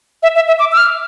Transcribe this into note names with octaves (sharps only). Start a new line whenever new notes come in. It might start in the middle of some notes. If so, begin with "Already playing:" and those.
E5
E5
E5
D6
E6
F6